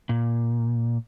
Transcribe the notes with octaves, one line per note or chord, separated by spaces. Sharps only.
A#2